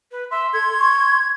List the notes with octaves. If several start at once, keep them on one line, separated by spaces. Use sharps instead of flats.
B4
E5 C6
A4 G#6
C#6